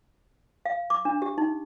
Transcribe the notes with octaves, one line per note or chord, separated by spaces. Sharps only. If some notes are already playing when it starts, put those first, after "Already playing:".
F5
D6
D4
G4
D#4